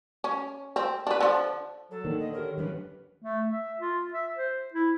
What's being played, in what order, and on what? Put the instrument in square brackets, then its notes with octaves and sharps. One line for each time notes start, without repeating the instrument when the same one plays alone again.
[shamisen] C#4
C4
D4 B4
D3 F3
[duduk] F#3 [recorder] A4
[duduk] D3 [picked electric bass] D#3 [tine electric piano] A#3 D#4 A#4
[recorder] D#5
[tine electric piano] G4 C#5 [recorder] A#4
[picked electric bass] D#3 F#3 D4 [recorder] B4
[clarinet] A3
E5
F4
E5
C5
E4